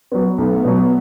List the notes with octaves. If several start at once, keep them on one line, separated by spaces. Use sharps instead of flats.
F#3 B3
B1 A3 B3
B2 F#3